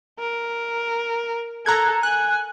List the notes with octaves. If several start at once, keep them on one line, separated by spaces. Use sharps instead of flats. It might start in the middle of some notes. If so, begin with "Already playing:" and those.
A#4
A4 A#5 F#6 G#6
G#5 F#6